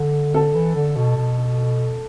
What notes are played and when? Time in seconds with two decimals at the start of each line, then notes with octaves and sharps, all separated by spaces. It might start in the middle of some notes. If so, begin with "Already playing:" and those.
Already playing: D3
0.34 D3 A4
0.54 E3
0.75 D3
0.96 B2
1.16 B2